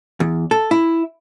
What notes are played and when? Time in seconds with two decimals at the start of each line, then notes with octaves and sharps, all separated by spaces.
0.20 E2
0.51 A4
0.71 E4